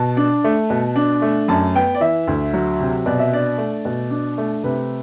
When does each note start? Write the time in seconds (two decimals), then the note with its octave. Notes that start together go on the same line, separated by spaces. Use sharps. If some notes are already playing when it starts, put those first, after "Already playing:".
Already playing: B2 A5
0.17 D4
0.44 A3
0.70 B2
0.96 D4
1.22 A3
1.48 F#2 A5
1.75 B3 G5
1.95 D5
2.01 E3 E5
2.27 D2
2.53 F#3
2.80 C3
3.06 B2 D5
3.19 E5
3.33 D4 D5
3.58 A3
3.85 B2
4.10 D4
4.38 A3
4.63 C3 B4